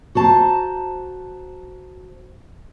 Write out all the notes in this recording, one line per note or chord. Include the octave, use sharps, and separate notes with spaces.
F#4 C5 A5 A#5